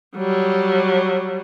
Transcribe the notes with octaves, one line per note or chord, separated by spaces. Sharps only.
F#3 G3